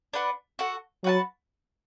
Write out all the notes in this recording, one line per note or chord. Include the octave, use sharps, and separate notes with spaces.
D4 B4 F#5
F#4 A4 F#5
F#3 F#4 B4 F#5 A5